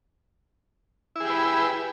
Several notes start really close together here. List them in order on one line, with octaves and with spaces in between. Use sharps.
E4 G#4 G4 B4